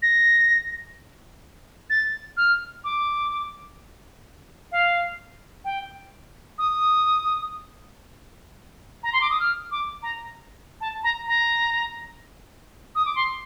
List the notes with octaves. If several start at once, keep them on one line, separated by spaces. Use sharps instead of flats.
A#6
A6
F6
D6
F5
G5
D#6
A#5
C6
D6
D#6
F6
D6
A#5
A5
A#5
A#5
D#6
D6
C6